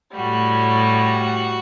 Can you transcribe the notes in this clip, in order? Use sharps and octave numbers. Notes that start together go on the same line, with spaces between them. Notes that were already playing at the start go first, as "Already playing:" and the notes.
A2 G3 F#4